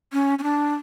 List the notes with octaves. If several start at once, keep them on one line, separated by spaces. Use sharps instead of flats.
C#4
C#4
D4